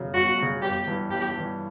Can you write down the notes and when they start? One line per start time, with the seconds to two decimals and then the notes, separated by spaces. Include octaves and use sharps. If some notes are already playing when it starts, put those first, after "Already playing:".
Already playing: G1 F#2 C#3
0.14 G1 F#4
0.38 F#2 C#3
0.62 G1 G4
0.87 G2 E3
1.11 G1 G4
1.35 G2 E3